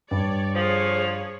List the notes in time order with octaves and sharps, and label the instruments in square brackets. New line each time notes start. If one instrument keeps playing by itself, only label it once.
[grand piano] G2 [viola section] C#5 D5
[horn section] D3 F3 [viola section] G#4 C#5